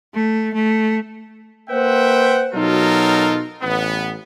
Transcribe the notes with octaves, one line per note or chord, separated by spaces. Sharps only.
A3
A3
A#3 B4 C5 E5 F#5 G5
B2 F#3 D#4 F4 A4 A#4
A1 B3